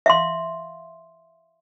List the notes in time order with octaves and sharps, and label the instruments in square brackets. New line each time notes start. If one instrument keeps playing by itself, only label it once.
[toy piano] E5 F5 C6